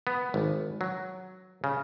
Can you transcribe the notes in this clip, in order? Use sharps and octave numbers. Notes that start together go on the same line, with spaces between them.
B3
G#1
F#3
C#3